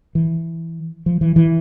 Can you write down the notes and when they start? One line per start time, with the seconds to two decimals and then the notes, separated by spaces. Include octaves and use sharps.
0.15 E3
1.06 F3
1.21 E3
1.36 E3